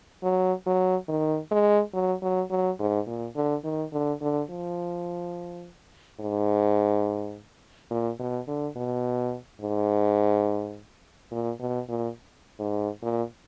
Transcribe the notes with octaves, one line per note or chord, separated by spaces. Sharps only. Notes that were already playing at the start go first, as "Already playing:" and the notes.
F#3
F#3
D#3
G#3
F#3
F#3
F#3
G#2
A#2
D3
D#3
D3
D3
F3
G#2
A#2
B2
D3
B2
G#2
A#2
B2
A#2
G#2
A#2